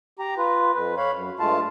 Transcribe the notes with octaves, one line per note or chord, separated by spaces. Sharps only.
G4 A#5
F4 B4
F2 B4
C#5 F5 B5
F#2
G2 G#3 A3 F4 F5 A5